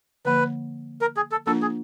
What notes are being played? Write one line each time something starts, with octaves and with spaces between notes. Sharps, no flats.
D3 F3 A#3 B4
A#4
G#4
A4
F3 A#3 D4 F4 A4 A#4
G#4